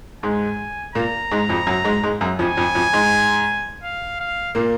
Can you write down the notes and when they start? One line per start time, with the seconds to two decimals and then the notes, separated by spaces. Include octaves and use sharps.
0.23 G#2 G#3 G#5
0.95 A#2 A#3 A#5
1.31 G#2 G#3
1.49 F2 F3
1.67 F#2 F#3
1.84 G#2 G#3
2.04 G#2 G#3
2.21 F#2 F#3
2.39 F2 F3 G#5
2.57 F2 F3
2.75 F2 F3
2.93 G#2 G#3
3.83 F5
4.20 F5
4.55 A#2 A#3